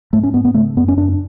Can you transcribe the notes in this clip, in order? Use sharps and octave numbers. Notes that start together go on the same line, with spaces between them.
G#2 A3
C#4
G#2 B3
B3
C#3 A3
F#2 B3
C#4
F#2 D4